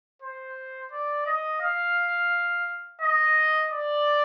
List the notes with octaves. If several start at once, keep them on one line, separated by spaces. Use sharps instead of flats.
C5
D5
D#5
F5
D#5
D5